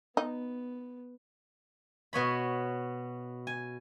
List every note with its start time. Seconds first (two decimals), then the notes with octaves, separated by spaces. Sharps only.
0.17 B3 D#4
2.13 B2 B3 C#5 B5
3.47 G#5